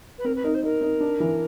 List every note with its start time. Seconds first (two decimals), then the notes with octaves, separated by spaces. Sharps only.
0.18 B4
0.24 C4 A#4
0.35 B4
0.43 D#4 A#4
0.54 C5
0.63 D#4 A#4
0.82 D#4
1.01 D4
1.20 E3